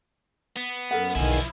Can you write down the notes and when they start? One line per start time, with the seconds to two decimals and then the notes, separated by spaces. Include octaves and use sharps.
0.57 B3
0.91 F#2 A4 A#4 F#5
1.15 B1 E2 D3 D#3 F3 E4 G#5